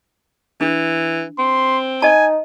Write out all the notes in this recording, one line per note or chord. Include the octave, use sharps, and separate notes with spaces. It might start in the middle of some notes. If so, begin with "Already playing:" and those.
E3 D4
C4 C6
D#4 D#5 G#5 A5